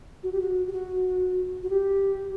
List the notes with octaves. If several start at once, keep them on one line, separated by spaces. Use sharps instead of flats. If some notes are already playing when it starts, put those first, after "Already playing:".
F#4
G4
F#4
G4
F#4
F#4
G4